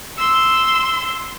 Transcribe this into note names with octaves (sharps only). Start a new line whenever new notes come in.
C6 E6